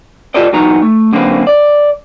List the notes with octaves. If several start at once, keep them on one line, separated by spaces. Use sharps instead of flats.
F4 G4 A4 B4 D5 D#5
E3 F#3 B3 D#4 A#5
A3
F#2 D3 A#3 C4 B4
D5